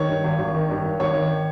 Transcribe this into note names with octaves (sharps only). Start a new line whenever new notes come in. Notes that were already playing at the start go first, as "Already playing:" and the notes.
Already playing: D#3 C#5
G2
G#1
G#1
D#3
G2
G#1
G#1 C#5
D#3